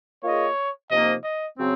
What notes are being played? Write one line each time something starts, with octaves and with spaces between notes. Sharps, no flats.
A#3 F4 G#4 C#5 D#5
C3 F3 A#3 D#4 D#5
D#5
C#3 F#3 C4